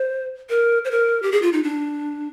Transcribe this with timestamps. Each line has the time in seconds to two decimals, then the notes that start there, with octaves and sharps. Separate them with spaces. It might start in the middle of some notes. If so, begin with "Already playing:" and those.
Already playing: C5
0.49 A#4
0.85 C5
0.91 A#4
1.23 G4
1.32 G#4
1.42 F4
1.53 D#4
1.63 D4